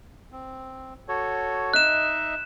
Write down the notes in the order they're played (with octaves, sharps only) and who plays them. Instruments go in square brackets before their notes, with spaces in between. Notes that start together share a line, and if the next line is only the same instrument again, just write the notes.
[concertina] C4
F#4 A4 C#5
[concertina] D#4 D#5 E5 [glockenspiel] F#6 E7